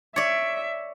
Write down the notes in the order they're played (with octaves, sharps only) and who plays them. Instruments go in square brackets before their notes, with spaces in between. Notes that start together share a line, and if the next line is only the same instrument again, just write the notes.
[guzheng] C#5 D5 [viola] E5